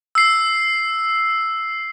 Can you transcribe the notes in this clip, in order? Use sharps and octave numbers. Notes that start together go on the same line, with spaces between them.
E6 C7